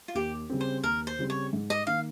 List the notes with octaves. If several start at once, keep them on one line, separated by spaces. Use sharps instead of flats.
F4
D#2 G4
C#3 G3 C4
C5
D#2 A#4
C5
C#3 G3 C4
C#5
G#2
D#5
D#3 A#3 F5